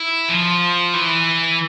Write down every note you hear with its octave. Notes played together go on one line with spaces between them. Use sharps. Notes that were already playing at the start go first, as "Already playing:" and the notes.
Already playing: E4
F3
E3